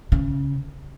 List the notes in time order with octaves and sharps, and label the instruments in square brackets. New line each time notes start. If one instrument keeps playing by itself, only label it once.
[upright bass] C#3